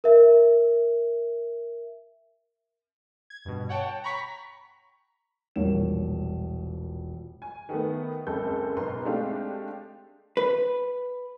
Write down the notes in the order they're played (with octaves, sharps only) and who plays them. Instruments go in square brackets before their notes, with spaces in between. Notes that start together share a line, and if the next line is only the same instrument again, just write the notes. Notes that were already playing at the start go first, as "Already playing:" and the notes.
[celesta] A#4 E5
[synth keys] G#6
G2 B2
C#5 F#5 G5 A5
A#5 B5 C#6 B6
[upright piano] E1 A#1 G3 A#4 C#5 E7
[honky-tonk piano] G#5
D#3 A3 B3
F#1 C#2 G#3 C4 A4 G6
B1 B2 B4 A#5 C6
G#3 A3 C4 D4 G4 F5
[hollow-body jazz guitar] B4